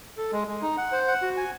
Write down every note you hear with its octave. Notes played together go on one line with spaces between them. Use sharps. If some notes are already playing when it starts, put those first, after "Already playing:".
A4
G#3
G#3
D#4
F#5
C5
F#5
F#4
G#5